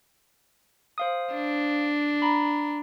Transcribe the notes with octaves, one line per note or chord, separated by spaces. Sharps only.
C5 F5 D#6
D4
A#5 B5